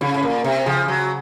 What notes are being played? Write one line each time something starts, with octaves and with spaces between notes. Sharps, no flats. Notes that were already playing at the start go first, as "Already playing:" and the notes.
C#3 C#4
A2
A#2 A#3
C3
C#3 F3
F#3